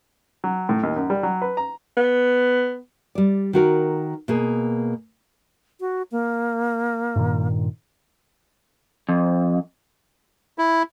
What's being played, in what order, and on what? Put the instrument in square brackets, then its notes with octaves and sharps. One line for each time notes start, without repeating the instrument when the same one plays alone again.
[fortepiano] F#3
A2
D#2
F#2
G3
F#3
B4
A#5
[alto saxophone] B3
[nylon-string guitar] G3 D5
D#3 F#4 A#4
B2 A#3 G#4
[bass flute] F#4
A#3
[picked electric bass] G2 A#2 D#3
[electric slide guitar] F2
[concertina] E4